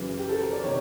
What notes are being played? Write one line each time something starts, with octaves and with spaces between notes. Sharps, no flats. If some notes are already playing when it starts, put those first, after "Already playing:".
Already playing: F#2 C#3 E3
G4
A4
A#4
D5
C3 D#3 C#5